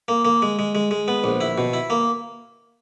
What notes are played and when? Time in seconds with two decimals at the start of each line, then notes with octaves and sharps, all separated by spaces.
0.08 A#3
0.25 A#3
0.42 G#3
0.59 G#3
0.75 G#3
0.91 G#3
1.08 B3
1.24 A#1
1.41 E4
1.58 B2
1.73 E4
1.90 A#3